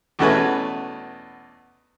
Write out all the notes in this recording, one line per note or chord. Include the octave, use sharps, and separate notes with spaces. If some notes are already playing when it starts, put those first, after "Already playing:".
E2 B2 A3 C#4 B4 G#5